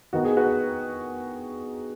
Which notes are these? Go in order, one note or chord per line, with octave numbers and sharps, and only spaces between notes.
D#3 B3 D#4 F#4
G#4
F#4 B4